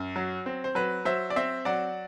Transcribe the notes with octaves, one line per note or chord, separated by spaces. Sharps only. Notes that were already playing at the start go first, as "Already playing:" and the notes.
Already playing: F#2
F#3
C4
C5
F#3 B4
F#3 C5 E5
D5
C4 C5 E5
F#3 D5 F#5